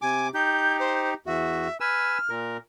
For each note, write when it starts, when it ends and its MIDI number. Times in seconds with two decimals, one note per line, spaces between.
0.02 0.30 48
0.02 0.28 80
0.02 0.30 86
0.34 1.14 63
0.34 1.14 67
0.34 0.77 91
0.79 1.10 72
1.26 1.68 40
1.26 1.68 66
1.26 1.80 76
1.80 2.18 71
1.80 2.18 80
1.80 2.18 88
1.80 2.36 89
2.30 2.57 46
2.30 2.57 70